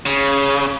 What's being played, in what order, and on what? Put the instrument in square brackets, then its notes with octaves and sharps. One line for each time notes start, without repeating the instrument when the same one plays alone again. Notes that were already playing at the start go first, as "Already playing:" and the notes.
[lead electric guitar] C#3